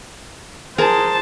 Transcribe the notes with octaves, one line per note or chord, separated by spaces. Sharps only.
G#4 A#4 C5 A5